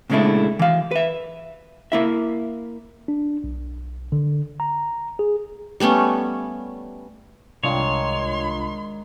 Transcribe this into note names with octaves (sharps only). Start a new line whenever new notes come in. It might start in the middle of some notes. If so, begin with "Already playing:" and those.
A#2 C#3 G#3 A3 D4 E4
E3 F5
B4 E5
A#3 E4 E5
D4
B1
D3
A#5
G#4
G3 A3 B3 C#4
C2 G#2 D#3 D4 F4 C#5 G#5 C6